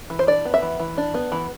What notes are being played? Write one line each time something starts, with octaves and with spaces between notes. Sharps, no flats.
E3
C5
D4 D5
B3
E5
E3
E3
D4
B3
E3